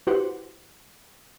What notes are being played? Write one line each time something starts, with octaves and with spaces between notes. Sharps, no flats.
E4 F#4 G4 B4 C5 F#5